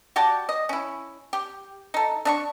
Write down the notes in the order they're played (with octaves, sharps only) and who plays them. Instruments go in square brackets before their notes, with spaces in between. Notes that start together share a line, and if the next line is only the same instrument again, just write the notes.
[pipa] F#4 G4 D5 A5
D#5
C#4 E4
G4
D#4 A4
D4 D#5 C#6